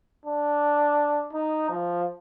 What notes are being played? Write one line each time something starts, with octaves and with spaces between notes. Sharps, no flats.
D4
D#4
F3